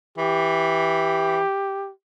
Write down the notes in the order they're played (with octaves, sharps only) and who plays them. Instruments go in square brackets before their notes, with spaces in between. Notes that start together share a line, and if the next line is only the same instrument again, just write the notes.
[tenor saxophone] E3 [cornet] G4